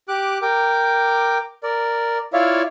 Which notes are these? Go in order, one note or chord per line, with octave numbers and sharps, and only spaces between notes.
G4 D6 F#6
A#4 G5 D6
A#4 D5
E4 F4 C#5 D5 E5 F5